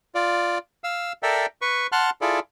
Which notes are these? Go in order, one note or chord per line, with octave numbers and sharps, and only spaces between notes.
F4 D5
F5 E6
A4 A#4 D5 E5 G5
B4 C#6
F#5 A5 C6 F6 F#6
E4 F4 G#4 A4 D5